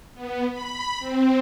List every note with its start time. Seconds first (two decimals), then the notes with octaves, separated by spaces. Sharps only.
0.14 B3
0.51 B5
0.99 C4